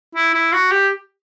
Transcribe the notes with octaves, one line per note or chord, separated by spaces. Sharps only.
E4
E4
F#4
G4